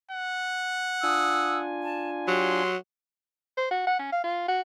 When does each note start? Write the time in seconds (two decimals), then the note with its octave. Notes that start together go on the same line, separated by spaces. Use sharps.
0.11 F#5
1.03 D4 F4 G#5 D#6 E6
1.82 A5
2.28 F#3 G4 C6
3.57 C5
3.71 F#4
3.87 F#5
3.99 C#4
4.12 F5
4.24 F4
4.48 F#4